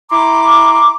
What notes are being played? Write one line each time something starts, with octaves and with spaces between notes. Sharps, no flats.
E4 A#5 C6 D6